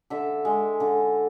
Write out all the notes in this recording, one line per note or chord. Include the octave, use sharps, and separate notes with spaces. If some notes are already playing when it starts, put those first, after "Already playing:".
D3 E5
G#3
D3